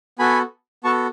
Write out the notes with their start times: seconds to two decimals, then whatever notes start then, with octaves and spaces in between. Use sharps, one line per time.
0.19 B3 F#4 A4 G#5 B5
0.84 B3 F#4 A4 A5 C#6